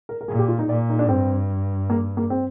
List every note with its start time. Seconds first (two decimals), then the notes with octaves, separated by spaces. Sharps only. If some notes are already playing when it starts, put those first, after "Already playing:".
0.09 A#4
0.21 A#4
0.28 A#2 G#4
0.39 G4
0.48 F4
0.59 D#4
0.69 A#2 D5
0.90 D#4
0.99 D4
1.09 G2 C4
1.90 A#3
2.17 A#3
2.30 C4